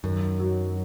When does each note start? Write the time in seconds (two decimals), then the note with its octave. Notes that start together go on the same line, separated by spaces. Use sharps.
0.04 F#2 D#3
0.39 F#3